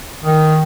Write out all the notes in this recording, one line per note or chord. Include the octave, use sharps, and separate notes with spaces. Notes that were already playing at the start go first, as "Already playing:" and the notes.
D#3